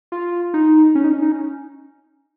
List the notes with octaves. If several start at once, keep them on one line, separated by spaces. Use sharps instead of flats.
F4
D#4
C#4
D#4
C#4
D#4
C#4